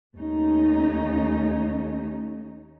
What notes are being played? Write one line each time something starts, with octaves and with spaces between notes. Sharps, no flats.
D#2 A3 C#4 D#4